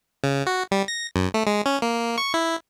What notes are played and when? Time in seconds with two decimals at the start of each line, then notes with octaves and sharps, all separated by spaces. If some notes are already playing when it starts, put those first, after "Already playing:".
0.24 C#3
0.47 F#4
0.71 G3
0.88 A#6
1.16 F#2
1.34 A3
1.47 G#3
1.66 C#4
1.82 A#3
2.18 C#6
2.34 E4